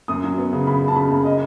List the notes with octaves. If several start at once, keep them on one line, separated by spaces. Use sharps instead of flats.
F#2 D#6
F#3
B3
C#3
C#3 B5
C#3
A5
C#3 B5
F#2
D#5